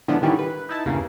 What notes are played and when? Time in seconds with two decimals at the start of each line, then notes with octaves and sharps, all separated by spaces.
0.08 A2 D3 F3 G#3 B3 D4
0.22 A2 D3 D#3 G3 C#4 E4
0.39 B4
0.69 D#4 E4 A5
0.85 E2 G2 C#3 A#3